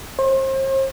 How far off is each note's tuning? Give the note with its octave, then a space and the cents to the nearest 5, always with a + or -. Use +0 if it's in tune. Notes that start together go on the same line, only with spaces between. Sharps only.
C5 +40